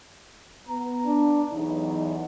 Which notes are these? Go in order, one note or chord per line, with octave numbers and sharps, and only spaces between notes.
B3 A#5
D4
B1 E2 D#4